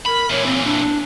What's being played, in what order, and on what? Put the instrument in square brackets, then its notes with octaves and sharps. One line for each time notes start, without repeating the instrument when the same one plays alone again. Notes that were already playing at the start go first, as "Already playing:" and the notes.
[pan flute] A#4 [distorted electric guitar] B5
[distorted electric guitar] A#2 E3 [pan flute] C#5
[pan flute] C4
D4